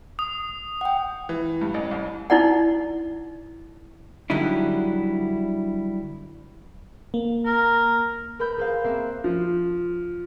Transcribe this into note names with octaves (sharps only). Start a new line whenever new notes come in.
D#6
F#5 G5
E3
G2
A1
C2
D#4 E4 D5 F#5
D3 F#3 G3 D#4 E4
A#3
A#4
A#4 B4 B5 E6 G6
G#4 C5 F5
A#3 C4 E5 F#6 C7
F3